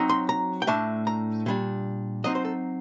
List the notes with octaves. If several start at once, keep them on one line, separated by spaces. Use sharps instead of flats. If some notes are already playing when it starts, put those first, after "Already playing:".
Already playing: F#3 C4 D#4
C6
A#5
G5
A2 A3 D4 A5
A#5
A#2 G3 D4
F#3 C4 D#4 D#5
C5
A4